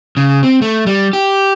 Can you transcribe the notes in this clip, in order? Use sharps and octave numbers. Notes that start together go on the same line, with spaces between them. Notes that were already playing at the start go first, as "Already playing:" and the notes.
C#3
C4
A3
G3
G4